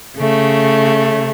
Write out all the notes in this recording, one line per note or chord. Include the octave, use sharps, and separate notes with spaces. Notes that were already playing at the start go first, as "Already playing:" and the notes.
C#3 A3